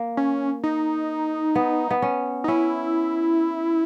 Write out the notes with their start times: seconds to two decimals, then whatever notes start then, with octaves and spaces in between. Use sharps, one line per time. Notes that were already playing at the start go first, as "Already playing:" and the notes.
Already playing: A#3
0.17 C#4
0.64 D#4
1.55 B3
1.91 B3
2.02 C#4
2.44 D#4
2.48 C#4 E4